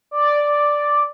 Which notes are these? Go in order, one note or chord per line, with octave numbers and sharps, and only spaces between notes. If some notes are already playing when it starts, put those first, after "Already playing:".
D5